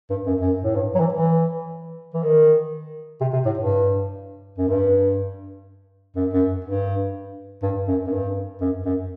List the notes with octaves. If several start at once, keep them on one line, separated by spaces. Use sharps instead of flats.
G2
F#2
F#2
A2
G2
F#3
E3
E3
E3
D#3
C3
C3
A2
G2
F#2
G2
F#2
F#2
G2
G2
F#2
F#2
G2
F#2
F#2